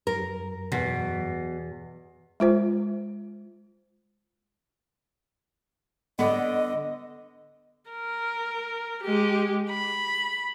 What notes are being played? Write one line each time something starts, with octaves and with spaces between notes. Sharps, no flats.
F#2 A#4
E2 B2
G#3 F4 C5
D3 B3 D#5
A#4
G#3 G4
B5